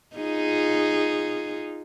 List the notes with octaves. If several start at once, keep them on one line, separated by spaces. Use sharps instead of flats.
D#4 F4 G#4